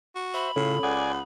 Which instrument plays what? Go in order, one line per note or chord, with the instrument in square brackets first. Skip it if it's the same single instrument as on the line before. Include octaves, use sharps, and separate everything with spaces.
[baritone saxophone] F#4
[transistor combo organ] C5 E5 [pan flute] B5
[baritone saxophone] A2 [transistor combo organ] C#3 F4 [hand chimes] C#4 A4 C#5
[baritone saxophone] C#2 [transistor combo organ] D5 G#5 [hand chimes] F#5 D#6